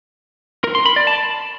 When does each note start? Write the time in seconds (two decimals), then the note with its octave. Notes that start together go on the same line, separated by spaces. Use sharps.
0.64 A#4
0.75 C6
0.86 B5
0.96 D5
1.07 A5